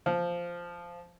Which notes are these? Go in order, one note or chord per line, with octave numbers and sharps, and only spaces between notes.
F3